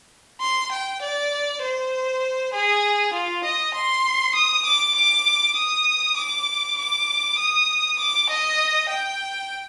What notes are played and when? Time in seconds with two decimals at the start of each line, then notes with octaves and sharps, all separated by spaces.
0.41 C6
0.72 G5
1.02 D5
1.62 C5
2.54 G#4
3.13 F4
3.44 D#5
3.75 C6
4.35 D#6
4.65 D6
4.95 D6
5.57 D#6
6.17 D6
6.78 D6
7.39 D#6
7.99 D6
8.30 D#5
8.90 G5